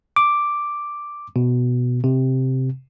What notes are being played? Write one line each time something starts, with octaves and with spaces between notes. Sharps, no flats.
D6
B2
C3